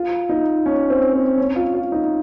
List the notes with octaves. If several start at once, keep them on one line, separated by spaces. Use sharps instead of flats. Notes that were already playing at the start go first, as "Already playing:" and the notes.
Already playing: F4
D#4
C#4
C4
C4
C#4
F4
F4
D#4